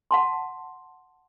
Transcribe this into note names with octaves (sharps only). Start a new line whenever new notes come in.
F#5 A5 C6